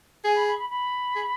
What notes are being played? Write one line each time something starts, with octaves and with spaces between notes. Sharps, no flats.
G#4 G#5
B5
B5
B5
B5
G#4